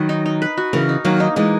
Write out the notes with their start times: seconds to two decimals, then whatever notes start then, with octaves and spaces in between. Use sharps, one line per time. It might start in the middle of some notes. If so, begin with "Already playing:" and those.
Already playing: D#3 F#3 B4
0.09 D#4
0.26 D#4
0.42 B4
0.58 F#4
0.73 C#3 E3 A#4
0.89 D#4
1.05 D#3 F#3 A#3
1.20 D#4
1.36 E3 G#3 D#4